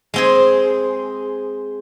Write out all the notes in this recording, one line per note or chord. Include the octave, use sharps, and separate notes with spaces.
G#3 C4 G#4